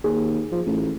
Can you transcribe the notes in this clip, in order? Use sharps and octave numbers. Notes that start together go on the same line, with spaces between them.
D#2 G#4
F3
A1